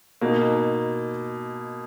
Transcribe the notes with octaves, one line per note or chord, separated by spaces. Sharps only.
B2 A#3 D#4